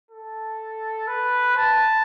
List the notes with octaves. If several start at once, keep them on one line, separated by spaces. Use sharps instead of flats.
A4
B4
A5